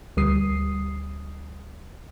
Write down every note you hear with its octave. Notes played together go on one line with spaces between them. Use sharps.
D2 G3 D#6 C7